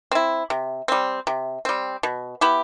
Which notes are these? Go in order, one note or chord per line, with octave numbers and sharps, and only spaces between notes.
C4 E4
C3
G3 C4
C3
G3 C4
B2
B3 E4 G4